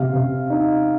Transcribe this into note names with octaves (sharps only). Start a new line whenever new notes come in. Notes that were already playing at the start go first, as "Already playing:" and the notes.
Already playing: C3 F5
C3
D#4